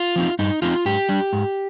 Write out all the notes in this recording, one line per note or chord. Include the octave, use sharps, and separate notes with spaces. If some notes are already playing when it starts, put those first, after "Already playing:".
Already playing: F4
F3 C4 D#4
G2 D#4
F3 C4 D#4 F4
G#2 G4
G3 D4
G#2